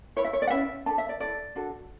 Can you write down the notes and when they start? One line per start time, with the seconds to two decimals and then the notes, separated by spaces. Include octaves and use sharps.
0.16 E4 B4 C#5
0.25 E5
0.33 C#5
0.42 D5
0.47 F#5
0.50 C#4 E4 B4 E5
0.86 D4 A5
0.90 A4
0.98 E5
1.09 D5
1.20 E4 A4 D5
1.56 D4 F#4 A4